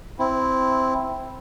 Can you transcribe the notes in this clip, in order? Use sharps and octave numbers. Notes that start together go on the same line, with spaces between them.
C4 E4